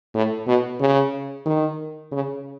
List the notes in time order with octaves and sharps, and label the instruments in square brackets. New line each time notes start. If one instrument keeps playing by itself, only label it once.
[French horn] A2
B2
C#3
D#3
C#3